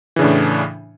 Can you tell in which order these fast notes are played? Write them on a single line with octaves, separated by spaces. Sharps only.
E3 C#3 D4 A2